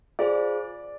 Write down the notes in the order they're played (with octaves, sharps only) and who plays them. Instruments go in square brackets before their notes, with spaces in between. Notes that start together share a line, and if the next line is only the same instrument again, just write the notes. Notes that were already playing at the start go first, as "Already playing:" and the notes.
[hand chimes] F4 G#4 C5 [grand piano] D5